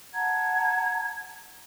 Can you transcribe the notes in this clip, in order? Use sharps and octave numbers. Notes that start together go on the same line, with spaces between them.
F#5 A5 A#5 G#6